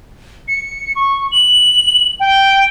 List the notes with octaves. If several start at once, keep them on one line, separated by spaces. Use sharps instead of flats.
C#7
C#6
F#7
G5